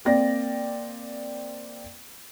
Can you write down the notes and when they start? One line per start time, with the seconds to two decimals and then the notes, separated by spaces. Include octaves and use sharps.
0.05 A#3 C4 D5 G5 A#6